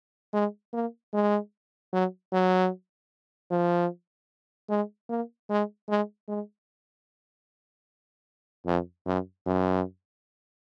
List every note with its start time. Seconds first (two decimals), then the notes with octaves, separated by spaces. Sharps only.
0.33 G#3
0.73 A#3
1.13 G#3
1.93 F#3
2.32 F#3
3.50 F3
4.69 G#3
5.09 A#3
5.50 G#3
5.89 G#3
6.28 G#3
8.66 F2
9.06 F#2
9.46 F#2